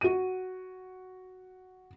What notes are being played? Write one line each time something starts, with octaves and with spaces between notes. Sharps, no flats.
F#4 D#7